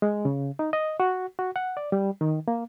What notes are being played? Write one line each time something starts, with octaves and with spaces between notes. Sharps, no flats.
G#3
C#3
D#4
D#5
F#4
F#4
F#5
D5
G3
D#3
A#3